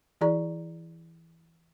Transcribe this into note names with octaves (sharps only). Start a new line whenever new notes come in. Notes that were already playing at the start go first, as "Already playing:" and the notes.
E3 E4 G#4 D5 A#5 C#6